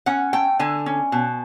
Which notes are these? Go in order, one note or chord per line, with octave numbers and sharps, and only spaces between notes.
C#4 F#5
A3 G5
D3 G#5
C#4
B2